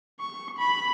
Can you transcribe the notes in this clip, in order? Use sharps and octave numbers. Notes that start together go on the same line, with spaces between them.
C#6
B5